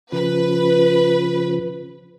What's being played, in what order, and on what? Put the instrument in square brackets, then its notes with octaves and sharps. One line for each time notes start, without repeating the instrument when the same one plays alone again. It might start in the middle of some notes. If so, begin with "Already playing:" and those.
[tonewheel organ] C#3 F3 [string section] B4